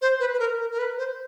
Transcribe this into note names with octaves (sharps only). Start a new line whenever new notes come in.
C5
B4
B4
A#4
A#4
A#4
B4
C5